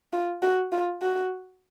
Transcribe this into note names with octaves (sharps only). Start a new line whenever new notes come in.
F4
F#4
F4
F#4